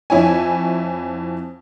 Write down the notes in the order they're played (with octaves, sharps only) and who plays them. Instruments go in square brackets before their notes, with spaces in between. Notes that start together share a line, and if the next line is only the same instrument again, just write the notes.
[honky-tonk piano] F2 E4 C#5 G#5